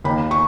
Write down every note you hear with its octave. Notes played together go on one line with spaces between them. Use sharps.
D#2 D#3 B5
C#6